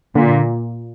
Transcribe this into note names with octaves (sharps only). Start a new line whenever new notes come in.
A#2 D3